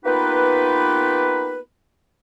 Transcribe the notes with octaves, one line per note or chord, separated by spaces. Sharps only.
A#3 B3 D#4 F4 G4 B4